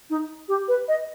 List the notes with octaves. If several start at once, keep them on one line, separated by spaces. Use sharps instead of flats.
D#4
G4
B4
D#5